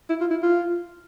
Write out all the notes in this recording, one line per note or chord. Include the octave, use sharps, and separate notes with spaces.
E4
F4
E4
F4